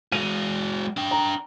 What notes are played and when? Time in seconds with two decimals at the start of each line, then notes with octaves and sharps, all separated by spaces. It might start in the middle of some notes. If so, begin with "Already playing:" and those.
0.12 G#3 F#4 D#7 F7
0.97 D4 G5
1.11 A#5